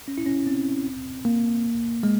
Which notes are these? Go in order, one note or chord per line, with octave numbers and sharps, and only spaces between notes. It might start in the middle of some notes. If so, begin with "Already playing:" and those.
C#4
E4
C#4
C4
A#3
G#3